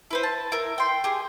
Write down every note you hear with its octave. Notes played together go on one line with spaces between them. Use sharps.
E4 B4 C5
A5
E4 A#4
G5 C6
G4 G#4